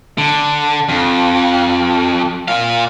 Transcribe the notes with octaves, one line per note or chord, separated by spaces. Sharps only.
D3
F2
A#2 F5